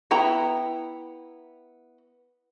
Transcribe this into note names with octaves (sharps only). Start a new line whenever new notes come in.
B3 E4 G5 A#5